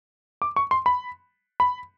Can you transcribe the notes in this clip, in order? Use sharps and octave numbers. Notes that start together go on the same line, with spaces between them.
D6
C#6
C6
B5
B5